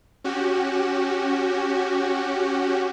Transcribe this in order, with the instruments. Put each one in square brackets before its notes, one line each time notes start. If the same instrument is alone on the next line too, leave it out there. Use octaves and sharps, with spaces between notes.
[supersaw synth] C#4 F#4 G4